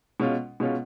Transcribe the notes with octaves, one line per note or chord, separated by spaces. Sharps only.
B2 G#3 C#4 F4
B2 G#3 C#4 F4